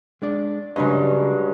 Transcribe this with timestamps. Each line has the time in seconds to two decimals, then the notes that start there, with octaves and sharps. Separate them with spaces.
0.22 G#3 D4 D5
0.76 G2 C#3 F#3 G#3 D4 D#5